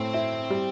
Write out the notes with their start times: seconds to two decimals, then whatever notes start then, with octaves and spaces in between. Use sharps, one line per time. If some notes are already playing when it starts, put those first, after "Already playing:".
Already playing: A2 A3 C4
0.14 E4
0.50 G3